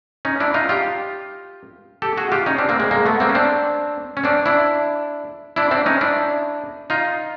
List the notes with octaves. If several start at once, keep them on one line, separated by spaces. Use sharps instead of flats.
C#4 D#4
D4 E4
D#4 F4
F4 G4
G4 A4
F#4 G#4
F4 G4
C#4 D#4
C4 D4
A#3 C4
G#3 A#3
G#3 A#3
A3 B3
A#3 C4
C#4
C4 D4
C#4
C4 D4
D4 E4
D4 E4
C4 D4
C#4 D#4
D4 E4
D#4 F4